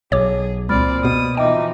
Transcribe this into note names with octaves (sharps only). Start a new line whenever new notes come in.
B1 G#4 C#5 D6
C#2 A#2 C4 D5 B5 F6 A6
B2 D#6
E3 F3 D#4 D#5 E5 G5 D6